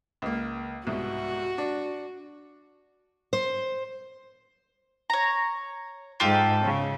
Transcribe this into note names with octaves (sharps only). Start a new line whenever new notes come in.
C#2 A#3
C2 G#2 B2 F#4
D4
C5
C#5 A#5
G#2 F4 G4 A4
C#3